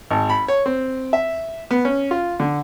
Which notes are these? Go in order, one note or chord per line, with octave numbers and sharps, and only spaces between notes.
G#1
B5
C#5
C4
E5
B3
C#4
F4
D3